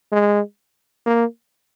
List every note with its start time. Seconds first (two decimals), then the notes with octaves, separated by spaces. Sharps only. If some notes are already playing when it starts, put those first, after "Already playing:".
0.12 G#3
1.06 A#3